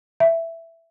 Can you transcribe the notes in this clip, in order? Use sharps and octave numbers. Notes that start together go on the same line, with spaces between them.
E5